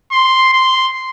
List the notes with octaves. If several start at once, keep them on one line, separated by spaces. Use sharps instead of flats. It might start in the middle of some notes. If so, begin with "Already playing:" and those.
C6
C6